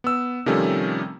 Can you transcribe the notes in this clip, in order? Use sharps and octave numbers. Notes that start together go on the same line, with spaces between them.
B3 E6
C3 D#3 F3 G3 A3 C#4